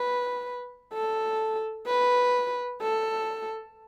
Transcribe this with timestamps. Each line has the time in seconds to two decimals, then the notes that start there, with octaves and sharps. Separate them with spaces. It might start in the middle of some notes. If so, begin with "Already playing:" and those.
Already playing: B4
0.93 A4
1.88 B4
2.81 A4